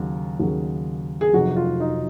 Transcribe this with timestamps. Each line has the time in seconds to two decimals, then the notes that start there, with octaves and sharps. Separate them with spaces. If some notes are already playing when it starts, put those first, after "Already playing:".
Already playing: D#2 C#3 F#3
0.40 D#2 C#3 F#3
1.21 G#4
1.33 F1 F2 D#3 F#3 F#4
1.56 F4
1.80 D#4